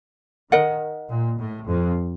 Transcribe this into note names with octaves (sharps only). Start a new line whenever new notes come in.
D#3 A#4 D#5 F#5
A#2
A2
F2